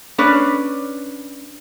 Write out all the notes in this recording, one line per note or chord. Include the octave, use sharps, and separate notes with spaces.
C#4 D4 B4